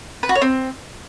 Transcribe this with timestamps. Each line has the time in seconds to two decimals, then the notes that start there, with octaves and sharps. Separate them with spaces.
0.23 B4
0.29 F#4
0.35 C#5
0.42 C4